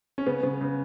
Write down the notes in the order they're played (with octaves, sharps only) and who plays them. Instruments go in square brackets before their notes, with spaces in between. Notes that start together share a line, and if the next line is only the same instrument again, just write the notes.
[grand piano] C#4
[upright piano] C#3 [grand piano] B3
[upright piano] C#3 [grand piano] B3
[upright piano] C#3